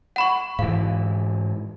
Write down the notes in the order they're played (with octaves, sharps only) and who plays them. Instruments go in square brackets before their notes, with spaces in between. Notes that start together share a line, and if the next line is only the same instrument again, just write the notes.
[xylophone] F#5 B5 C#6
[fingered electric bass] G#2 E3 [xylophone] F5